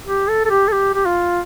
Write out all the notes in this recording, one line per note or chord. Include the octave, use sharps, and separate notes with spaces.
G4
A4
A4
G4
A4
G4
G4
F4